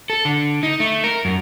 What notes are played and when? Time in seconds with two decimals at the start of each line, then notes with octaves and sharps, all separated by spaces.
0.10 A4
0.25 D3
0.63 D#4
0.80 A3
1.04 A#4
1.25 F#2